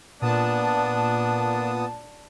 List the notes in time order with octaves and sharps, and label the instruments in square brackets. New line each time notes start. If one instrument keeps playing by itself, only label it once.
[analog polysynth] A#2 A5 [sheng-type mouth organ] B3 D#6 [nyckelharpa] D4